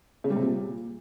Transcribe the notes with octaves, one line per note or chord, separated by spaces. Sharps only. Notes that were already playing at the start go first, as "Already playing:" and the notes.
C#3
G3
C3
A#2